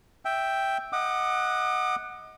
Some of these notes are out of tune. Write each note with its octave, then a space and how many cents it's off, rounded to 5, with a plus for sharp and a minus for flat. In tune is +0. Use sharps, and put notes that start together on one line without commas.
E5 +0 G5 +0
D#5 +25 F#5 +0 D6 +40